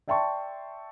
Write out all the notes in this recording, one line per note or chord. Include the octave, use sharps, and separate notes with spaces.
D5 E5 G5 A5 C6 C#6